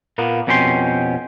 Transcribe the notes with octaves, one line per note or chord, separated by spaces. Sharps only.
A#2 A#3 B3
F2 B2 C#4 G4 C6